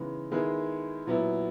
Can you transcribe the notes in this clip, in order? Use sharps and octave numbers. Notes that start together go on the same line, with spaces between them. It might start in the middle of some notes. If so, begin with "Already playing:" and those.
Already playing: C#3 E3 G#3 B3 D#4
D#3 G#3 B3 E4 G#4
A#2 F#3 B3 E4